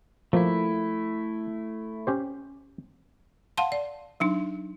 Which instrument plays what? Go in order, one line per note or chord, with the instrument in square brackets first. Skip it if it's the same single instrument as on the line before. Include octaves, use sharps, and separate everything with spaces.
[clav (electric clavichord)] F3 A#3 [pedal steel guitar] A3 E4
[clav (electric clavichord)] C#4 G4 C5
[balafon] F5 F#5 A5 C6
D5
F#3 D4 D#4